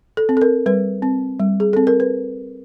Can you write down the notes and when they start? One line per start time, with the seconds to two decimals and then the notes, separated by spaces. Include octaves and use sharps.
0.17 A4
0.29 C4
0.37 A4
0.41 A#4
0.66 G3 B4
1.02 C4
1.40 G3
1.60 G#4
1.73 C4 A4
1.87 A#4
2.00 B4